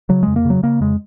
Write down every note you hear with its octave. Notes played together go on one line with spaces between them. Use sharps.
C#3 F#3
F2 G#3
A#3
C#3
F#3
C#3 A#3
F2 G#3